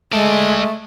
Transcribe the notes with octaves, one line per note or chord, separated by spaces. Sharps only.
G#3 A3 D5 E5